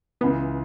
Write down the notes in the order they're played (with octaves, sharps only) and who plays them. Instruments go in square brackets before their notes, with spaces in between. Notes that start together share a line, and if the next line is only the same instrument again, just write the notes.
[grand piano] C#2 C#3 E3 [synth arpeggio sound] B3